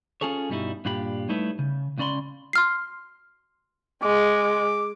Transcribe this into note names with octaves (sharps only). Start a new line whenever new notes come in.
C#4 F4 G#4 A4 C#5
G2 B2 G3 D#4 E4
G2 A#2 D4 F4 G4 B5
G3 A3 D#4 E4 B4 C#5
C#3
C#2 C#3 C#4 D5 B5 C6
C6 F6 C7
G#3 D6